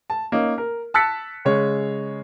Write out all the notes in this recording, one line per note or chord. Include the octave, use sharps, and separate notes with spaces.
A5
A#3 C#4 D#4
A#4
A5 E6 F#6 A6 B6 C#7
C#3 G#3 C#5